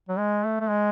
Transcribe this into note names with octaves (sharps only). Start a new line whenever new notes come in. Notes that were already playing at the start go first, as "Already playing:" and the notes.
F#3
G#3
A3
A3
G#3